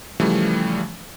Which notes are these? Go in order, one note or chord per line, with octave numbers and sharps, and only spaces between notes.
C#3 E3 F3 G3 A3